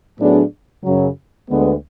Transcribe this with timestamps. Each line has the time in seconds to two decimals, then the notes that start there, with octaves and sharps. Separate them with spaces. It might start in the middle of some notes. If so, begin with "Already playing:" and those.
0.18 A2 F#3 B3 D4 G#4
0.84 F#2 C#3 F#3
1.50 D2 D3 G#3 B3